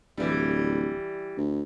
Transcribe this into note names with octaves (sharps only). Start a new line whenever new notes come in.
D1 E3 G3
D2